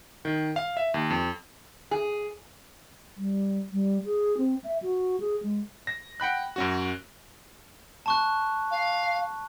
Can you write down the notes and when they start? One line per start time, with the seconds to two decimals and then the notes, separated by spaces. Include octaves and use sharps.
0.25 D#3
0.56 F5
0.77 E5
0.94 D#2
1.10 F2
1.91 G#4
3.17 G3
3.72 G3
4.05 G#4
4.37 C4
4.64 E5
4.82 F#4
5.20 G#4
5.42 G#3
5.87 A#6
6.20 F#5 G5 B5 F#6
6.56 F#2 C#4 F#4
8.06 A5 C#6 F#6
8.71 F5